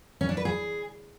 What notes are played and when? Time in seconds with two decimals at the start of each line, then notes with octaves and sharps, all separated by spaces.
0.21 C#4
0.29 D4
0.37 B4
0.45 G#4